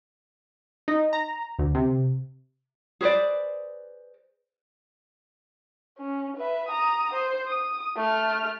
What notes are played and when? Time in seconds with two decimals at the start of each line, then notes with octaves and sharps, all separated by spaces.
0.88 D#4
1.13 A#5
1.59 D2
1.75 C3
3.01 G#4 B4 C5 D5
5.98 C#4
6.37 B4 E5
6.68 A#5 D#6
7.13 C5
7.47 D#6
7.97 A3 F6